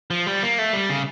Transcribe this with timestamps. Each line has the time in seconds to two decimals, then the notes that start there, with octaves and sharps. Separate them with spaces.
0.10 F3
0.27 G3
0.43 A#3
0.59 A3
0.73 G3
0.89 C#3